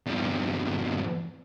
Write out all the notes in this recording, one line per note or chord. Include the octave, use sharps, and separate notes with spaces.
E2 G2